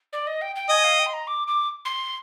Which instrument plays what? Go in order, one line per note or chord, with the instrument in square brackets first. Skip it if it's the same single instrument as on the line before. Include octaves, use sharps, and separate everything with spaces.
[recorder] D5
D#5
G5
G5
[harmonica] D#5 [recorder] G#5
[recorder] F5
G5
C6
A#5
D6
D6
C6